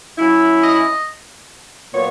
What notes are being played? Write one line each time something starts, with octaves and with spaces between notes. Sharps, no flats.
F#3 C#4 E4
D#5
A#2 F#3 B3 C#5